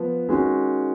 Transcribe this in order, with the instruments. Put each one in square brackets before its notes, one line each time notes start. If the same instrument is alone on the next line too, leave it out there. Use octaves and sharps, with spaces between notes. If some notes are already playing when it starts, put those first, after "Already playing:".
Already playing: [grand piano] F3 B3
D#3 G#3 C#4 F#4